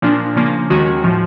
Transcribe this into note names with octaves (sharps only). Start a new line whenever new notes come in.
A#2 F3 A#3 D4
C#3 F3 A#3
D#2 D#3 G#3 C#4 F#4
A2 F3